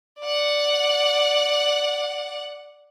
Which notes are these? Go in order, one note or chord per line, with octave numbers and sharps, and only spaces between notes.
D5 F#5